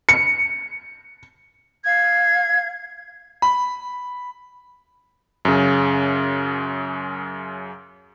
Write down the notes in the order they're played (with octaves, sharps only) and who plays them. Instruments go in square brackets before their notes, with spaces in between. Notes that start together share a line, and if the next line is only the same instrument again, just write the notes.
[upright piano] C#7
[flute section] F5 G#6
[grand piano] B5
[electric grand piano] F#2 C#3